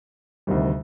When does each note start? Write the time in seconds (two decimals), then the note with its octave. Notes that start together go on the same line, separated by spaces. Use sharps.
0.47 D2 C3 D#3 G3